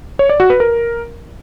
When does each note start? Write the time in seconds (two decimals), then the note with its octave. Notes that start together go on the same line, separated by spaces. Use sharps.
0.19 C#5
0.29 D5
0.40 F#4
0.50 B4
0.60 A#4